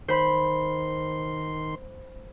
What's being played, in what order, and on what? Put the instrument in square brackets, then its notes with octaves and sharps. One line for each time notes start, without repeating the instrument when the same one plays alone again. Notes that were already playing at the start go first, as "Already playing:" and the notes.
[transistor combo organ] D#3 C6 [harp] C5 B5